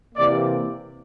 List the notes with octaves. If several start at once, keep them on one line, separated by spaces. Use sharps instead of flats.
C3 E3 A#3 D5